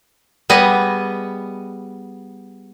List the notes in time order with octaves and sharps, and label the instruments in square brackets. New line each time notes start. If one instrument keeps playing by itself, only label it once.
[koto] G3 B3 G#4 D#5